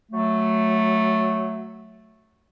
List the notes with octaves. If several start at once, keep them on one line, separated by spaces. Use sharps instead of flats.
F#3 A3